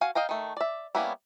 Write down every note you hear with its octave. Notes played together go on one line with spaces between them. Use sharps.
F#4 F5 G#5
D#5 F5 G5 A#5
D#3 A3
D5 E5
G3 A#3 B3 C#4 E4